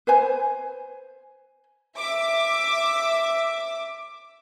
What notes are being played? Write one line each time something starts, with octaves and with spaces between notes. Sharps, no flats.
B4 C5 G#5
E5 D6